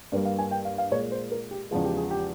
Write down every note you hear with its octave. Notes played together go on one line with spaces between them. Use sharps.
G2 G3 A#3
F5
G#5
G5
F5
F5
A#2 G#3 C#5
C5
A#4
G4
E2 C#3 F3 G#3 F4
G4
G#4
G4